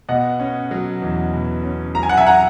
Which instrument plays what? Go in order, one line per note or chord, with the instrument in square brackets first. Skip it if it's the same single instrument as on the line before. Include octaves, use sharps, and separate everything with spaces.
[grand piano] B2 [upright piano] D#5 F#5
[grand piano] C#4
F#3
E2
B2
C#4
[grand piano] F#3 [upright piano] A#5
[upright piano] G#5
F#5
E5 G#5
F#5 A#5